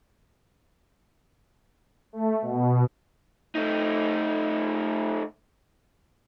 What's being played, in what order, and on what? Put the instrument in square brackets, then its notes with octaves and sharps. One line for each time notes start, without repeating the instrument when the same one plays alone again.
[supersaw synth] A3
B2
[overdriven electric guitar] A3 D#4